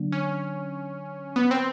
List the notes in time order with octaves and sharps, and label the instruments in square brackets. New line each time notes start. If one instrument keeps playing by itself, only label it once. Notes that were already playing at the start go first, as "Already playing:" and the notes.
Already playing: [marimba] D3 F#3 A#3 D4
[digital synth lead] C#4
B3
C4